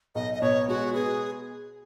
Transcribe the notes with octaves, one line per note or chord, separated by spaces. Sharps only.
B1 D#5
D#5
B2 C#5
G#3 F#4
B3 G#4